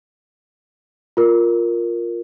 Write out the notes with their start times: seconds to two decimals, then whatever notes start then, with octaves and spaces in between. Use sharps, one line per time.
1.17 F4 A#4